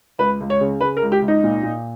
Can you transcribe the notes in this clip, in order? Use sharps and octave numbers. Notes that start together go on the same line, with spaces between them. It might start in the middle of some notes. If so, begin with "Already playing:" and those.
C#2 B4
C#2
C#5
C#3
C#3 B4
A#4
C#2
G4
C#2
D#4
A#2
A#2